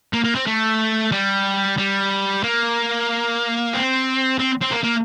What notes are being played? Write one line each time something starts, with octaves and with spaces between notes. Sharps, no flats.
A#3
A#3
C4
A3
G3
G3
A#3
C4
C4
C4
A#3
A#3